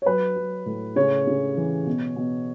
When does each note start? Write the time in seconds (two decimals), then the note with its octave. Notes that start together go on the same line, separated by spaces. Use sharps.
0.02 C#5
0.06 F#3 B4
0.36 F#3
0.66 A2
0.96 C#3 C#5
1.27 C#3
1.57 E3
1.86 B2
2.16 B2